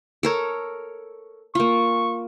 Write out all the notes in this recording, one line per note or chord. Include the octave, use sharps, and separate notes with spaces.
A4 A#4 C#5
A#3 F4 C#6